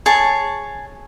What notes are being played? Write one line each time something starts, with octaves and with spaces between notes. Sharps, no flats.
G#4 C#5 A5